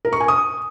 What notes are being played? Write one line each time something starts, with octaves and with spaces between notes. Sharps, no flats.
A#4
C#6
G#5
D#6